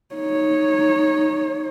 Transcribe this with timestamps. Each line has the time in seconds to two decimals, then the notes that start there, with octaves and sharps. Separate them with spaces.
0.15 D#4 C#5